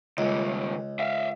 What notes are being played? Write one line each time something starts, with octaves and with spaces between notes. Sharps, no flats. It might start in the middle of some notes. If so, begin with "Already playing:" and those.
C#2 D#3 G3
E5 F5